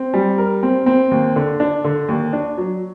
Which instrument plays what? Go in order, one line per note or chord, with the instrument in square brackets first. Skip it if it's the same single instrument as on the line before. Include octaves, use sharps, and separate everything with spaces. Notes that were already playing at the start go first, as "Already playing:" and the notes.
Already playing: [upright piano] C4
G3
A#4
C4
C4
D#2
D3
D4
D3
D#2
D4
F#3